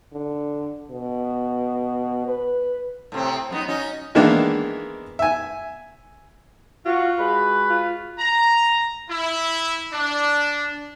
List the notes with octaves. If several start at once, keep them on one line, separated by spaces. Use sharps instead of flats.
D3
B2
B4
A2 C3 C4
F#2 B3 D#4
C#4 D#4 F#4
D#3 E3 G#3 A#3 B3 D4
E5 G#5
F4 F#4
G#3 F#4 B4
F4
A#5
E4
D4